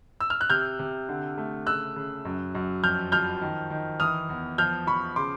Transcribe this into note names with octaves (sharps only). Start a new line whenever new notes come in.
E6
F6
F#6
C3 F6 G6
C3
D3
A3
C#3 E6 F#6
C#3
F#2
F#2
F2 F6 G6
F3 F6 G6
D#3
D#3
E3 D#6 F6
E2
F3 F6 G6
F3 B5 C#6
C#3 C6 D6